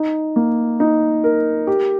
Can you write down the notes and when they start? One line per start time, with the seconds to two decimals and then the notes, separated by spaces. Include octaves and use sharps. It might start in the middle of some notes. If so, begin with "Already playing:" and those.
Already playing: D#4
0.36 A#3
0.80 D#4
1.24 A#4
1.67 G4